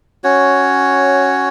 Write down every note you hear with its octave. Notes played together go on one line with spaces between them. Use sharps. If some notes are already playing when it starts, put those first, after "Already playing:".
C#4 F#4 C#5